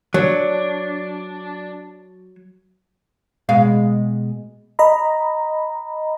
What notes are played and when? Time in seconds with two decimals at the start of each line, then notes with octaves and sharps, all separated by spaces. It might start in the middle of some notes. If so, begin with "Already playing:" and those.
0.14 F#3 D4
3.49 B2 G#3 F5
4.79 D#5 A#5 B5